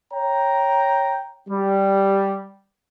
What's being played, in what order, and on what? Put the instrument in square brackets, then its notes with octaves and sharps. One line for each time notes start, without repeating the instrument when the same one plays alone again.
[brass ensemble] C#5 G5 A#5
G3